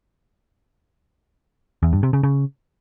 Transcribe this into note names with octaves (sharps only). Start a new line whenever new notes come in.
E2
G2
C3
C#3
C#3